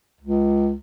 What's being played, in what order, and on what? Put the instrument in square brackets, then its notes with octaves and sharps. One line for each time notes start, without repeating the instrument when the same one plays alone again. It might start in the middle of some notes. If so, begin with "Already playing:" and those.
[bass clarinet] C#2